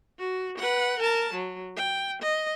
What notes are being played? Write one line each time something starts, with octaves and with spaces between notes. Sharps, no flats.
F#4
B4 F#5
A#4 A5
F#3
G5
D#5